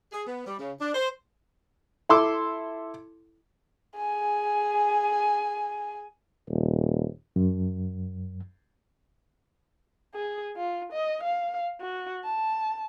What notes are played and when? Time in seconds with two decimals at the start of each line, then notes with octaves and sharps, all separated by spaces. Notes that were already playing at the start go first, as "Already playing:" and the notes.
0.12 G#4
0.27 B3
0.46 G3
0.60 C#3
0.81 D4
0.95 C5
2.09 E4 A4 C6 D6 E6
3.96 G#4 G#5
6.49 D#1
7.36 F#2
10.15 G#4
10.56 F4
10.93 D#5
11.24 F5
11.81 F#4
12.24 A5